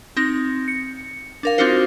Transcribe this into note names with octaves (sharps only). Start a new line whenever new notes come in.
C4 D#4 A#6
C#7
D4 A#4 F5
C4 D4 D#4 F4 F#4 C5